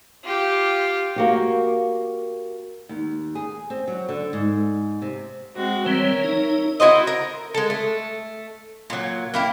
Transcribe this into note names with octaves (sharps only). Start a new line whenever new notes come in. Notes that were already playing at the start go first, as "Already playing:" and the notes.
F4 G4
A#3 F#4 G4
D#2
G#4
C4
F#3
D3
G#2
C3
G#3 C4 F#4
E3 G3 C4 A#4 C#5 E5
D#4
E4 F#4 C5 D#5
A#4
G#3 A4
A3
A#2 F#3
A#3 E4 G4